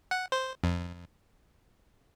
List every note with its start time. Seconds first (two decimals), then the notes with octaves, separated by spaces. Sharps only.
0.11 F#5
0.32 C5
0.64 F2